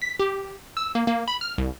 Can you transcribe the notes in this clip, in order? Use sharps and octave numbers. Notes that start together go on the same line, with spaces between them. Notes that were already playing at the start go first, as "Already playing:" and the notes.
B6
G4
E6
A#3
A#3
B5
F6
C2